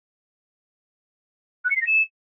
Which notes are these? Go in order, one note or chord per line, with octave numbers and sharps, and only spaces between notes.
F#6
C#7
C7
A#6
E7